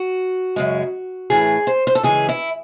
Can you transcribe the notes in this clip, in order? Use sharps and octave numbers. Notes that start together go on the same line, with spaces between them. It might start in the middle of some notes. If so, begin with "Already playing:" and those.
Already playing: F#4
F#2 C#3 G#3
A2 E3 A3 G#4
C5
C5
A4
C#3 E3 G#3 G#4
E4